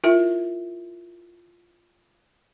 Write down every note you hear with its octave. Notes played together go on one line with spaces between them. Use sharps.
E4 F4 A#4 E5